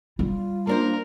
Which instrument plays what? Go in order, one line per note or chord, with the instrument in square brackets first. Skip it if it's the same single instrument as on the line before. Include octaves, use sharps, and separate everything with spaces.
[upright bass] G3 [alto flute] F4
[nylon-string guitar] A#3 D4 C5 [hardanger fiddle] A#4